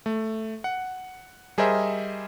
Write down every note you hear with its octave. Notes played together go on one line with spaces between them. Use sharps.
A3
F#5
G3 G#4 A#4 C5 D#5 E5